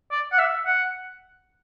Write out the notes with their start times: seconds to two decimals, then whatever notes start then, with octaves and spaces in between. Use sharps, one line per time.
0.12 D5
0.32 F#5
0.38 E5
0.66 F#5